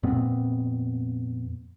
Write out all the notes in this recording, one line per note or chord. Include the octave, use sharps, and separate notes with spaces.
F2 A#2 B3 C4